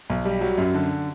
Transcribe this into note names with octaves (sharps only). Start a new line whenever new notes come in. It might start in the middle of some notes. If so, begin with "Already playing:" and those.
B1
G3
F#3
F#2
D3